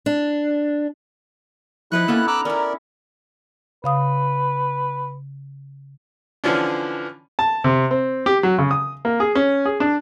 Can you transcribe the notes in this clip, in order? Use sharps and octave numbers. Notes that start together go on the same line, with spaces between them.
D4
F3 D#4 E4 B4 C#6 F#6
A#3 B3 C#4 A4
A#5 D6 E6 F#6
C#4 E4 A#4 D5
C#3 B4 F5 D#6
D3 E3 F3 C#4 D4
A5
C3
C4
G4
F#3
C#3
D#6
A#3
G#4
C#4
G#4
D4